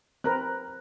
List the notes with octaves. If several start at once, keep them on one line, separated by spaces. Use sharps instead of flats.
C4 A#4 B4 A#5 F#6